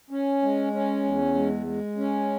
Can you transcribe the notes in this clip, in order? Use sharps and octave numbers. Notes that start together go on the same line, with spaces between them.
C#4
G#3
C#4
E2
G#3
G#3
C#4